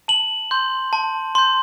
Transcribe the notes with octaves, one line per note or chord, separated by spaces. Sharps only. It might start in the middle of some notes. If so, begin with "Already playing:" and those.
A5 F#7
C6 G6
A5
C6 G6